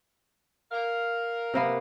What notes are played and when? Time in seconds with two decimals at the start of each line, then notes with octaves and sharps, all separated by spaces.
0.71 A#4 F5
1.54 C3 A#3 B3